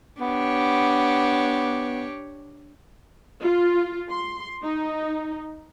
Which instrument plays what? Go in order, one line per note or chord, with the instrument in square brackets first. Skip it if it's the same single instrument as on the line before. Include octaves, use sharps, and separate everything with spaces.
[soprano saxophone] B3 [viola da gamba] D4 G4 C#5
[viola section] F4
C6
D#4